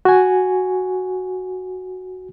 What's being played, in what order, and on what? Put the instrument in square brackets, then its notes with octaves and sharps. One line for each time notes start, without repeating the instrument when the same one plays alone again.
[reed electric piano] F#4 G#5